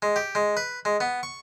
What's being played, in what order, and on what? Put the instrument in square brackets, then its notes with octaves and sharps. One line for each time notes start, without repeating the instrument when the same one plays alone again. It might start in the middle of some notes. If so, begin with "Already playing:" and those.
[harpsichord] G#3
G4
G#3
B4
G#3
B3
C#6